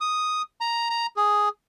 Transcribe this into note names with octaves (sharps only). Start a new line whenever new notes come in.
D#6
A#5
A#5
G#4